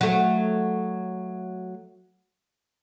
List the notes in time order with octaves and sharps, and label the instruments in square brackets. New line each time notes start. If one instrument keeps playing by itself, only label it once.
[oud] F#3 A3